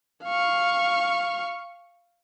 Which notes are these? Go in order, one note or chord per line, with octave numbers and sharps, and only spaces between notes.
F5 C#6